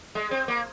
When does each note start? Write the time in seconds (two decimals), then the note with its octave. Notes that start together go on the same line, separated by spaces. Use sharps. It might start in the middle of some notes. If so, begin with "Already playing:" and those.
0.15 G#3
0.31 C4
0.48 A#3